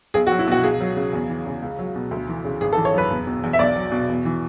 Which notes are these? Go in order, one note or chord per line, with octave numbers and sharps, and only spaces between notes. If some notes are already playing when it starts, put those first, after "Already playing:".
B1 G#4
F#4
F#3
E4
B2 F#4
C#2 G#4
F#3
C#3
E2
E3
C#3
C#2
F#3
B2
D2
E3
C#3
G#1 G#4
A4
E3
C#5
F#2 B4
E1
B2
E2
E5
B1 D5
F#3
B2
E2
E3